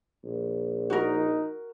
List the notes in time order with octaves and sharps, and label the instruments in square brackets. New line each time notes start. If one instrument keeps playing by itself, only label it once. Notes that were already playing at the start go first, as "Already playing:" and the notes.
[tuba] A#1
[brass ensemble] D#4 [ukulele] F#4 A#4